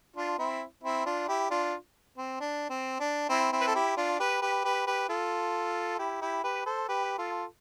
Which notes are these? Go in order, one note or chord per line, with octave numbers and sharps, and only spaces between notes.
D4 F4
C4 E4
C4 E4
D4 F4
E4 G4
D4 F4
C4
D4
C4
D4
C4 E4
C4 E4
B4
A4
E4 G4
D4 F4
G4 B4
G4 B4
G4 B4
G4 B4
F4 A4
E4 G4
E4 G4
G4 B4
A4 C5
G4 B4
F4 A4